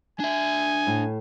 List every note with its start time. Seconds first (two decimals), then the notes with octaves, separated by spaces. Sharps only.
0.20 D4 E5 G#5
0.87 A2